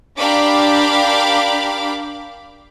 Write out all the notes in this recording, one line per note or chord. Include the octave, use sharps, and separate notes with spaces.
D4 G4 A#4 F5 B5 D6